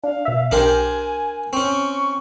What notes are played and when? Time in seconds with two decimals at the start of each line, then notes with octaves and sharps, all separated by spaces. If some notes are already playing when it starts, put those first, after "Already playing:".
0.03 D4 F5
0.25 B2 E5
0.51 B1 D4 G4 A#4 C5 G#5
1.53 C4 C#4 C#6